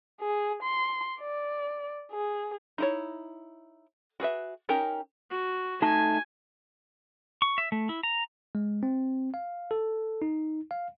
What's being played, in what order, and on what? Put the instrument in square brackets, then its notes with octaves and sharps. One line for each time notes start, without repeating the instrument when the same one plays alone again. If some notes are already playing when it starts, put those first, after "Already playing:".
[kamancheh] G#4
C6
D5
G#4
[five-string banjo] D#4 E4 C#5
F#4 G#4 B4 E5
C#4 D#4 G4 A#4
[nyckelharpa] F#4
[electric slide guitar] A3 D#4 A5 [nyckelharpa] G#5
[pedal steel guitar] C#6
E5
A3
E4
A#5
[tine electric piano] G#3
C4
F5
A4
D#4
F5